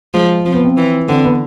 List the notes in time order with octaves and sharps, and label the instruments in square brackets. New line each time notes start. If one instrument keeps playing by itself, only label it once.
[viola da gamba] F3 [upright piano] G#3 G#4
[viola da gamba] F3 [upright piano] C4
[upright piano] B3
C4
[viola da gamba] E3
[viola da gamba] D3 [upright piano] C4
[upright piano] B3